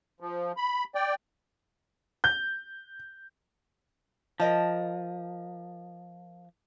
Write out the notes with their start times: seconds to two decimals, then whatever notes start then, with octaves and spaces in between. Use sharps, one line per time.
0.20 F3
0.57 B5
0.95 D5 G5
2.24 G6
4.40 F3 A#4 D#5 A5